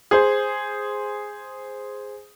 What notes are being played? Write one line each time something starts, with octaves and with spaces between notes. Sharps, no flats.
G#4 C5